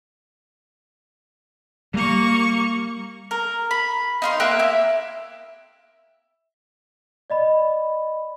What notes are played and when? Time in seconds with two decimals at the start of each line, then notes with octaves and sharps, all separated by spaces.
1.94 G3 A#3 C#6
3.31 A#4
3.71 B5
4.22 D#4 F5 C6
4.40 A#3 G4 E5 F#6
4.59 E4
7.30 D5 D#5 B5